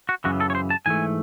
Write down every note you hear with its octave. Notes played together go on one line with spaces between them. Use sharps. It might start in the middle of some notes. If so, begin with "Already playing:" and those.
F#4
F#2 C#3 E3 F#4
A4
C#5
C5
A5
G#2 E3 A3 G#5